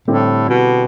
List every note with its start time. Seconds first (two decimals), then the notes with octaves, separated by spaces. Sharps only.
0.08 A2 D3 G3 C4 E4 G4
0.49 B2